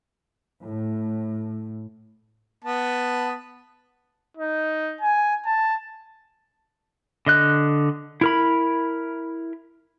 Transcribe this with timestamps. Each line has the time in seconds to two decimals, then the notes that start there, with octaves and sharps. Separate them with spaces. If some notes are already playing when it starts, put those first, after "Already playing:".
0.63 A2
2.64 B3 A5
4.37 D#4
5.01 G#5
5.45 A5
7.26 D3 D#5 F#6
8.21 E4 A#4 B5